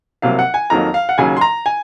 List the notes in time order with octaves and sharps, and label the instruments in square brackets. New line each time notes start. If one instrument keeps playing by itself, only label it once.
[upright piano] C2 C3 F#3 A#3 F5
F#5
G#5
F2 D#3 F#3 A#3 A#5
F5
F#5
D#2 C#3 F#3 G#5
C6
A#5
G#5